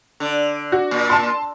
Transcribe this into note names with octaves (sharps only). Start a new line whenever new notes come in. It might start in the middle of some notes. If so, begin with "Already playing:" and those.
D3
F#4
A#2
A5 C6